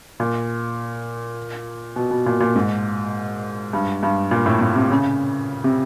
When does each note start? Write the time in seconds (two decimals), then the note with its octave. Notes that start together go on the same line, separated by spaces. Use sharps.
0.20 A#2
1.96 B2
2.11 B2
2.26 A#2
2.40 A#2
2.56 G#2
3.73 G2
4.03 G2
4.31 A#2
4.46 A2
4.61 A2
4.76 C3
4.91 C#3
5.64 C3